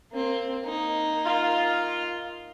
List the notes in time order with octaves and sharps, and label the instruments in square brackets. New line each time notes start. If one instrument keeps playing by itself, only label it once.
[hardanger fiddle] A#3 C4
A#3 D#4
[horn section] F4